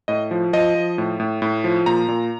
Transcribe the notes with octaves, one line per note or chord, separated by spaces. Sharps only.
A2 D#5
F3
F3 D#5
F3
A2
A2
A2
F3
A#2 A#5
A#2